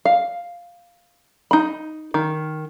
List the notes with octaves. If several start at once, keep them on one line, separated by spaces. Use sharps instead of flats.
F5
D#4 B5
D#3